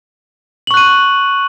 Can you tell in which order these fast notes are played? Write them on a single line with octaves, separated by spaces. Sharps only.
F#7 C#6 F#6 D#7